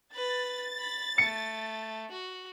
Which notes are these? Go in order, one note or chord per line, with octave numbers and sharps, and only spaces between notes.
B4 A6
B5
A3 C#7
F#4